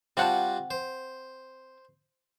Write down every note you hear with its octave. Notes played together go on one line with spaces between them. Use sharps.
G3 C4 F4 F#4 F#5 A5
C5